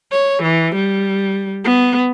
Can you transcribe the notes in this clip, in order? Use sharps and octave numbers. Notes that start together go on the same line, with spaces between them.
C#5
E3
G3
B3